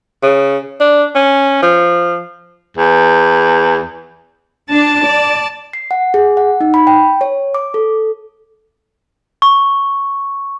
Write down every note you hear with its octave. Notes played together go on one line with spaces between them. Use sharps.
C#3
D4
C#4
F3
E2
D4 A5
D5
C7
F#5
G#4
F#5
D#4
B5
G5
C#5
D6
A4
C#6